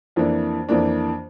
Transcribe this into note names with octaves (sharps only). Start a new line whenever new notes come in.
F2 E3 A#3 D4
F2 E3 A#3 D4